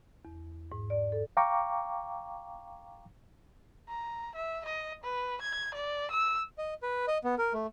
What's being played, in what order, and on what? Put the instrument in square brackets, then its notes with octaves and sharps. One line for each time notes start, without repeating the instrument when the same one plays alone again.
[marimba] E2
G#2
D5
A4
[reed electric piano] F5 G5 A#5 C#6 D6
[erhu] A#5
E5
D#5
B4
G#6
D5
E6
[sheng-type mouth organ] D#5
B4
D#5
B3
A#4
A3